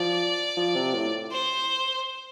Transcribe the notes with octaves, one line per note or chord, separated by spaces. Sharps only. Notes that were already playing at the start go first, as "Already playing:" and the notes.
Already playing: F3 D5
F3
C3
A2
C5